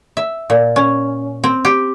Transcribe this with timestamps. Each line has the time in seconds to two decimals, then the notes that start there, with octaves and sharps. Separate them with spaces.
0.17 E5
0.50 A#2
0.76 C#4
1.44 C4
1.65 G4